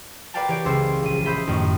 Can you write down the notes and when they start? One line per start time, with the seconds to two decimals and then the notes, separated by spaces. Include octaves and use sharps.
0.34 A#4 B4 D5 F5 G5 A5
0.48 E3 G4 C#5 D5 G5 D7
0.65 C#2 C5 C#5 E6
1.03 A#1 D#7
1.25 C5 D#5 E5 B5 G6 B6
1.47 A1 F#2 D#3